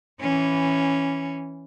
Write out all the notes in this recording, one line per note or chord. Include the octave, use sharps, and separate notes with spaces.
E3 C#4